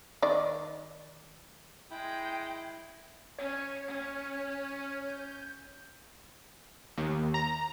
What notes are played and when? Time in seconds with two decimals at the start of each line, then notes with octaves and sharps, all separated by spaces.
0.22 D#3 D5
1.91 G#3 E4 G5
3.38 C#4 C#5
3.88 C#4
5.09 G6
6.98 D#2
7.34 A#5